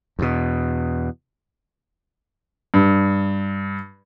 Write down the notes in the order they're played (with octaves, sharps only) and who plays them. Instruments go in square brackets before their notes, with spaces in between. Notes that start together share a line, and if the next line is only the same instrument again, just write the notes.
[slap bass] E2 B2
[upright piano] G2